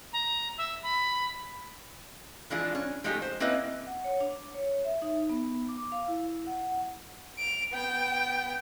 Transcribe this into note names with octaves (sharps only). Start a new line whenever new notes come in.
A#5
E5
B5
E3 F3 G#3 D4 F4 G#4
C#4
F3 G#3 A3 D#4 F4 G4
C5
A#3 C4 C#4 E4 B4 D#5
F#5
C#5
D4
C#5
E5
D#4
B3
D6
F5
E4
F#5
D7 F7
B3 G5